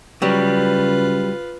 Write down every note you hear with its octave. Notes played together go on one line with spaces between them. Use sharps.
C#3 F#3 G3 F4 B4